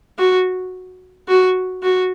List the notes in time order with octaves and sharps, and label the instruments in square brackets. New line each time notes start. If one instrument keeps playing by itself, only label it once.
[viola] F#4
F#4
F#4